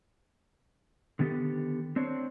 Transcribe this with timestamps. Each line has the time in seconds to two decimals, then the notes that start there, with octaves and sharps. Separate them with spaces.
1.19 D3 D#3 B3 F#4 G4 A4
1.96 C4 D4 C5 C#5